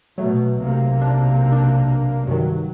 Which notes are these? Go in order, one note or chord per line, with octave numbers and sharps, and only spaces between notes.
B2 F#3 A3
B1 C3 A#3
D4
D4
G2 D#3 F#3